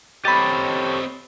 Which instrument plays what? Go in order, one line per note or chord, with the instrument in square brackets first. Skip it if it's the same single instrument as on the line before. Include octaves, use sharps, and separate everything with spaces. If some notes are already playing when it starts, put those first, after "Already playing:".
[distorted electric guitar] C4 D#5 [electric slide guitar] G4 A4 C#5 [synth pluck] B5 A6